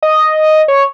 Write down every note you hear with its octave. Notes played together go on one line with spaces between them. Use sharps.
D#5
C#5